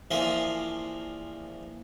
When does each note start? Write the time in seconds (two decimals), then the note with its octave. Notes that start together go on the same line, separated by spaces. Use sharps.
0.11 A#1 E3 F3 A#3 G#4 C6